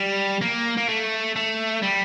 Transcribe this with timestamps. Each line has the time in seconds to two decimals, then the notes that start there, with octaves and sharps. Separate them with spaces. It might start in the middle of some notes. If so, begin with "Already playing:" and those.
Already playing: G3
0.41 A#3
0.77 A#3
0.88 A3
1.36 A3
1.83 G3